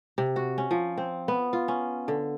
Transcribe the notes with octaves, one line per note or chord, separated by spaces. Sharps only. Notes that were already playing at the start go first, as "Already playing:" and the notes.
C3
F#4
C#4
F3
C4
B3
F4
C#4
D3